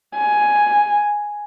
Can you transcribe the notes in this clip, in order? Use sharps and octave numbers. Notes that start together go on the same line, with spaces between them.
G#5